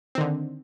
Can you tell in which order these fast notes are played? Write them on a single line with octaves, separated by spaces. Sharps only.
C4 D#3 D3